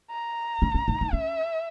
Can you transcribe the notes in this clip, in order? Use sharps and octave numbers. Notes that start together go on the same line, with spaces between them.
A#5
C#4
C#4
D#4
D#4
C#4 E5